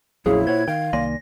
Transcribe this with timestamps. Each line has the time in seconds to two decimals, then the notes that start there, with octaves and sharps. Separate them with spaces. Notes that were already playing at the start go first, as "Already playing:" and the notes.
0.26 A#1 F2 A#2 F#3 C#4 E4 G#4
0.47 A#2 C5 C#5 F#5 G#6
0.68 D#3 F5 G5
0.93 C2 D#3 A#3 D5 G#5 C6 A#6